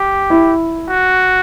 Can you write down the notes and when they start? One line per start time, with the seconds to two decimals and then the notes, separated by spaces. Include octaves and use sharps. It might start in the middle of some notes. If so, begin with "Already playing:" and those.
Already playing: G4
0.30 E4
0.89 F#4